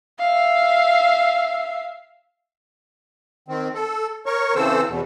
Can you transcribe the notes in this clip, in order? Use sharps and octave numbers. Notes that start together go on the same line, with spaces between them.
E5 F5
D#3 C4
A4
A#4 C#5 C#6
C#3 E3 C4 A4 C5 E6
E2 B2